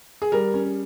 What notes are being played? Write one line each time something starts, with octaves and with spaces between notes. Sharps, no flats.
G#4
G3 A#4
C#4